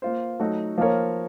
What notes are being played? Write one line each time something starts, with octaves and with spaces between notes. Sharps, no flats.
A#3 F4 C5
F#3 A3 D#4 F#4
F3 A#3 F4 A#4 C#5